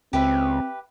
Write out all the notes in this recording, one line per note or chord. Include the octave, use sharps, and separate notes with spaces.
C#2 C4 G4 B4 E5